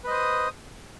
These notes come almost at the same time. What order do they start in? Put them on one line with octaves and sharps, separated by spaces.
B4 D#5 C5 D#6